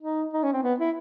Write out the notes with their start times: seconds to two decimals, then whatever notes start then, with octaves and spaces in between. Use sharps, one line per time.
0.01 D#4
0.33 D#4
0.43 C#4
0.53 C4
0.63 B3
0.80 E4